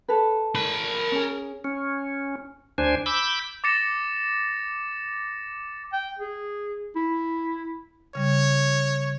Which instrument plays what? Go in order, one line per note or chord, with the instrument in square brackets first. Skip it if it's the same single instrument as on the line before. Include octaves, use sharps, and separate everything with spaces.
[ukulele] A4 B4
[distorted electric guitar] A#4 B5
[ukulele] C#4 G#4
[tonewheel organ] C#4
D2 D4 C5 G#5
B5 D6 E6 G6
[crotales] D6 A6 A#6 C#7 E7
[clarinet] G5
G#4
E4
[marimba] C#3 G3 [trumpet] C#5